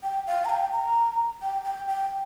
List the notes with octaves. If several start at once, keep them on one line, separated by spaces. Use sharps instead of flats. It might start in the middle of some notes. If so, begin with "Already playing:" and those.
G5
F5
A#5
G5
A#5
G5
G5
G5